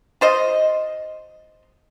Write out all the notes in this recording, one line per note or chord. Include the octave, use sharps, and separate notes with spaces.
F4 C5 D#5